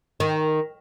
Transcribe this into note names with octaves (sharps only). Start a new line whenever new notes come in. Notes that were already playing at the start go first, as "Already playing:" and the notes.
D#3